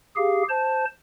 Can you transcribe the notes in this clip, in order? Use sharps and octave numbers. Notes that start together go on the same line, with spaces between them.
G4 G#4 F5
C5 A5